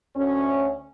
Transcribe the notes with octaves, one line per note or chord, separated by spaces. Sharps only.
D2 C#4